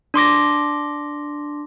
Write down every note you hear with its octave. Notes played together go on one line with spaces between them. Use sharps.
D4 C6 D6 A#6